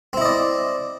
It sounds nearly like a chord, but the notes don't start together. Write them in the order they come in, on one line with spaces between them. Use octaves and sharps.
C4 E4 D#5 D5